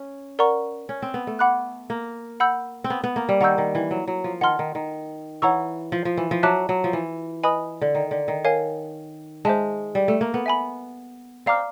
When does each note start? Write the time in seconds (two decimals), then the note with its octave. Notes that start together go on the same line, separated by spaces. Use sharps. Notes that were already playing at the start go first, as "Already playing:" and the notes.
Already playing: C#4
0.39 A#4 D5 F#5 A#5 C#6
0.89 C#4
1.02 C4
1.14 B3
1.27 A3
1.39 F#5 B5 D6 F#6
1.90 A#3
2.40 F#5 B5 E6 G6
2.84 C4
2.90 B3
3.04 B3
3.16 A#3
3.29 G3
3.41 D#3 F#5 A#5 C#6 E6 G6
3.58 D#3
3.75 E3
3.91 F#3
4.07 F#3
4.24 F3
4.41 D#3 F#5 A5 C6 F6
4.59 D#3
4.75 D#3
5.42 E3 C#5 F#5 A#5 C#6 E6
5.92 F3
6.05 F3
6.17 E3
6.31 F3
6.43 F#3 E5 A5 D6 F#6
6.69 F#3
6.84 F3
6.93 E3
7.43 B4 D#5 G#5 B5 D#6
7.81 D3
7.95 D#3
8.11 D3
8.28 D#3
8.45 A#4 C#5 F5 G#5
9.45 G#3 C5 E5 A5
9.95 G3
10.08 A3
10.21 A#3
10.34 B3
10.46 E5 G#5 B5
11.46 C4 D5 F5 A#5 D6 F6